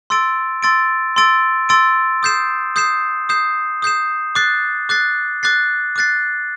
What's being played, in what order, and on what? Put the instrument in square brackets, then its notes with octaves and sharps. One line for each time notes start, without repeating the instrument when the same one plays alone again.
[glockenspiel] C6 E6 A6 D7
C6 E6 A6 D7
C6 E6 A6 D7
C6 E6 A6 D7
D#6 G6 C7 E7
D#6 G6 C7 E7
D#6 G6 C7 E7
D#6 G6 C7 E7
D6 F#6 A6 C7
D6 F#6 A6 C7
D6 F#6 A6 C7
D6 F#6 A6 C7